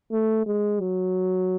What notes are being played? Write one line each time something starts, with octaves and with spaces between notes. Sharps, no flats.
A3
G#3
F#3